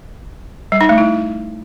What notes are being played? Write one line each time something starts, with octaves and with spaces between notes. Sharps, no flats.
G3
D#4
A3
E4